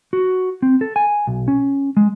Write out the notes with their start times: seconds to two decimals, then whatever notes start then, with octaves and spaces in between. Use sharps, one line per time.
0.13 F#4
0.62 C4
0.81 A4
0.96 G#5
1.27 B1
1.48 C#4
1.97 G#3